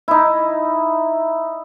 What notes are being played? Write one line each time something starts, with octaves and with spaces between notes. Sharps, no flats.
D#4 E4